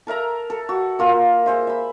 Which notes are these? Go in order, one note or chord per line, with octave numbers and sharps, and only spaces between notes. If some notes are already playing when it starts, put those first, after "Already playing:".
A4 A#4 E5 A#5
A4
F#4
A#3 F4 A#4
G#4 C5 E5
E5 B5